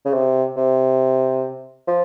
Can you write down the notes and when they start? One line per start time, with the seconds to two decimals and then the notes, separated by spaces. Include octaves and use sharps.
0.05 C#3
0.13 C3
0.57 C3
1.87 F3